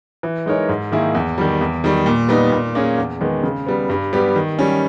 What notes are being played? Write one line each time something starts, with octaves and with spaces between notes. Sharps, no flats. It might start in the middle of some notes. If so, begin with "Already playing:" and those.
E3
G#3 D#4 A#4 C#5
G#2
D#3 A#3 E4 G#4
E2
D#3 G3
E2
D#3 G3
A#2
G3 B3 D#4
A#2
A#3 C#4 G#4
E2
D#3 G#3 B3
C#3
G3 B3
G2
G3 B3 G4
D#3
G3 C#4